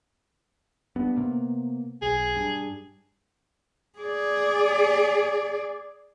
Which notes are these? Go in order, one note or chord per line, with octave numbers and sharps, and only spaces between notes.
G2 B3
C3 A#3 B3
B1 G#4
G2
G#4 D5